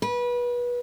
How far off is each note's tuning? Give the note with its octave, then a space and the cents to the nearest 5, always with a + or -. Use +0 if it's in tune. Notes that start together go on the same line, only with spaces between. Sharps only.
B4 -25